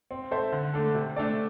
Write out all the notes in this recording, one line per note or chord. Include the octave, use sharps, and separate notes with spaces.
C4
A4 C5 E5
D3
A3 D4 A4
C3
A3 D4 A4 D5